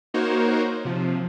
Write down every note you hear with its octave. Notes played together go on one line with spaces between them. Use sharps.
A#3 D#4 F#4 A#4 C5 C#5
C3 F3